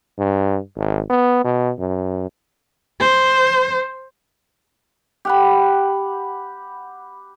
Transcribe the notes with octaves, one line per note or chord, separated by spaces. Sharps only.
G2
G#1
B3
B2
F#2
C5
G4 F#5 B5